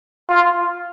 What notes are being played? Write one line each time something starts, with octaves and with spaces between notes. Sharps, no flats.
F4